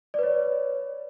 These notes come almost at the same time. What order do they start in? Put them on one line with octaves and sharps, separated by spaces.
D5 B4 C#5